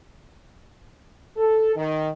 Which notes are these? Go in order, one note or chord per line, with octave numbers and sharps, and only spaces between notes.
A4
D#3